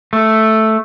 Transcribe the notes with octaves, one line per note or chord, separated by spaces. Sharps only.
A3